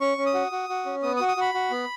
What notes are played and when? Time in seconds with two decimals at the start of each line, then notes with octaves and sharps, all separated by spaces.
0.01 C#4 C#6
0.18 C#4
0.26 D#6
0.34 F#4
0.52 F#4
0.69 F#4
0.86 C#4
1.03 B3 D#6
1.17 D#6
1.20 F#4
1.28 D#6
1.37 F#4 B5
1.54 F#4
1.71 B3